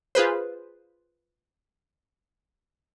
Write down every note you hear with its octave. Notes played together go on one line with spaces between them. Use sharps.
F4 G#4 B4 C5